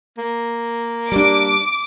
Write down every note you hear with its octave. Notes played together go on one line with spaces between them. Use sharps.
A#3
G3 D4 D6